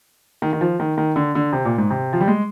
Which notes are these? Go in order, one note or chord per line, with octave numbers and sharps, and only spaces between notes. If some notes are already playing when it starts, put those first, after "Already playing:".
D#3
D#3
F3
D#3
D#3
D3
D3
C3
A#2
G#2
C3
F3
G3
G#3